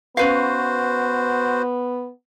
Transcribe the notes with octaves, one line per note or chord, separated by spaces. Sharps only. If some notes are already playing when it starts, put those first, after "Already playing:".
B3 C#4 F#4 B4 C5 F5